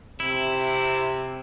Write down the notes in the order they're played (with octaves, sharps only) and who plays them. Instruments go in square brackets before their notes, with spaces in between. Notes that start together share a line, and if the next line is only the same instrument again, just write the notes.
[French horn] C3 [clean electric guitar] E4